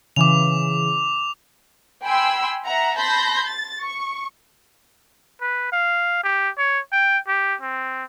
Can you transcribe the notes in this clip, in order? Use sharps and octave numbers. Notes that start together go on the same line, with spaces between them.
C#3 E3 D6 F7
G5 G#5 B5 C6 E6
E5 F#5 A#5
A5 B5 C6 G6 A#6
A6
C#6
B4
F5
G4
C#5
G5
G4
C4